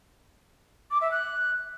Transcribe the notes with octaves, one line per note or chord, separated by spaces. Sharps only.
D6
E5
F#6